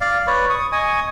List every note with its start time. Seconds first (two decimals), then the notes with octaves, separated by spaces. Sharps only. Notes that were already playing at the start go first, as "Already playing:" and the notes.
0.01 D5 F5
0.27 B4 C#5 D5
0.50 C#6 D#6
0.72 D#5 G#5 C#6 D#6